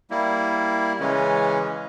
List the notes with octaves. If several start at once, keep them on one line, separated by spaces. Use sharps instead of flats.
G3 A#3 E4
C#3 E3 G#3 C#4